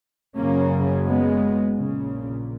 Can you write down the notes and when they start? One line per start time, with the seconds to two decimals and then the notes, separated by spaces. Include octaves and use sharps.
0.37 F#1 F#2 C#3 A#3 C#4
1.07 G#3 B3
1.77 A#1 A#2 C#3